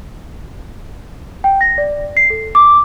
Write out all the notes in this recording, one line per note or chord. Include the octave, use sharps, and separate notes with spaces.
G5
A#6
D5
C7
A4
D6